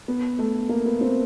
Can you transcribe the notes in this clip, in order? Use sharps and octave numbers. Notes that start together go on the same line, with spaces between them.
B3
A3
A#3
B3
C4